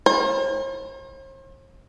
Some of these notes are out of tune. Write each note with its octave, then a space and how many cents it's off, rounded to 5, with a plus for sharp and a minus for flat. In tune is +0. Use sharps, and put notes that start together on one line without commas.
C5 +45